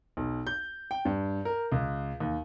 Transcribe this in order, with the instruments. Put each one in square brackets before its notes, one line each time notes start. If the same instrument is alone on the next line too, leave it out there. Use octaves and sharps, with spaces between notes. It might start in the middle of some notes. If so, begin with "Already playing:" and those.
[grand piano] B1
G6
G5
G2
A#4
C#2
D#2